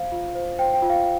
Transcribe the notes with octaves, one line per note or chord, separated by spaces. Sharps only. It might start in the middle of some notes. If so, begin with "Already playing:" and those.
Already playing: C5 F5
F4
C5
C5 G5
G5
F4
F5